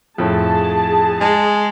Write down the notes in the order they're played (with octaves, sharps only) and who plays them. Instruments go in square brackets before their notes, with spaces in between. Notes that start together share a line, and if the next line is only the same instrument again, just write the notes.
[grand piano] F2 A2 [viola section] G#4 A5
[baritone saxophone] G#3